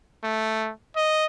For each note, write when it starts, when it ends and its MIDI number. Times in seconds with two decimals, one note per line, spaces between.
0.24 0.70 57
0.96 1.25 75